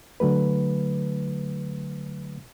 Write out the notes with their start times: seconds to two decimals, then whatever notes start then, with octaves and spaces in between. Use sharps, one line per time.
0.20 D3 F#3 A3 B4